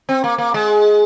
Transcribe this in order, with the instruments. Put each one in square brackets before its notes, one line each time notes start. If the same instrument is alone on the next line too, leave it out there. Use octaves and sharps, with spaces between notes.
[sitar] C4
A#3
A#3
G#3